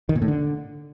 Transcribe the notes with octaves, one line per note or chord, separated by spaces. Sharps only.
D#3
A#2
A2
D3